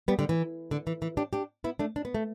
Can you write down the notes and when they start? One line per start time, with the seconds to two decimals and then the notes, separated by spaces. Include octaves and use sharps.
0.08 G3 B3
0.19 D3 G3
0.29 E3
0.71 D3
0.87 E3
1.02 E3
1.17 D4 G4
1.33 D4 G4
1.64 B3 E4
1.79 A3 D4
1.96 D4
2.05 B3
2.15 A3